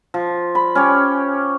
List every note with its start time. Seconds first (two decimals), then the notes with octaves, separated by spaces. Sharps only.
0.14 F3
0.55 B5
0.75 C#4 G4 C#5